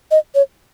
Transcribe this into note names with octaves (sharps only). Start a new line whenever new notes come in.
D#5
C#5